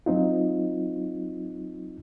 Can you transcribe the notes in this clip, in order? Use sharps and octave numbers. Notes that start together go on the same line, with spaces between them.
F#3 C4 D#4 F4